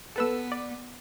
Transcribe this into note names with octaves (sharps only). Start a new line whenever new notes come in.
B3 A4 B4 E6
D5